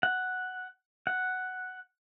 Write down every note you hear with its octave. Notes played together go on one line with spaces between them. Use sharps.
F#5
F#5